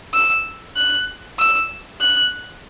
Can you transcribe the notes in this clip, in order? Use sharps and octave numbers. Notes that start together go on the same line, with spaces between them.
E6
F#6
E6
F#6